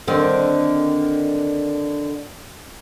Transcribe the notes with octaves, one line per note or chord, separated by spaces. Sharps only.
D3 D#3 C4